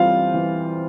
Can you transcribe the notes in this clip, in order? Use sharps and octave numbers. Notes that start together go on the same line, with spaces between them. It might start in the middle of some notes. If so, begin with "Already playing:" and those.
Already playing: E3 G3 C4 F4 C5 F5
E3